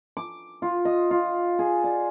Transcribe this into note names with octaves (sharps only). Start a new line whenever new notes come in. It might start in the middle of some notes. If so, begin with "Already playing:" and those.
D6
F4
D#5
F4
G#4
D5